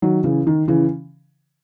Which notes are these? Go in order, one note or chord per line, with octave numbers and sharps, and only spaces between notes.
D#3 F#3
C#3 E3
D#3
C#3 E3